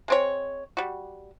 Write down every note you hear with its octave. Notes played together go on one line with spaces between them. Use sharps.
G#3 C4 C#5
G3 F#4